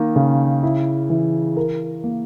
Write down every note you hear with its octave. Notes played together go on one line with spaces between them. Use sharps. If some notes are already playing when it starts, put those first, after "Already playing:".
Already playing: D#3 A#3
C#3
E4
E3
A#4
A#3